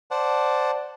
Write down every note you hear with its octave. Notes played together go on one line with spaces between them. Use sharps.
C5 D5 F#5 A5